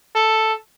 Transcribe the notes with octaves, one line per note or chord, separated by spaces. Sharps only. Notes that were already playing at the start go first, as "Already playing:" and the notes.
A4